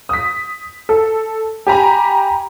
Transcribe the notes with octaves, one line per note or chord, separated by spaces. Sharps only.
D#6 B6
A4
G4 G#5 A#5 B5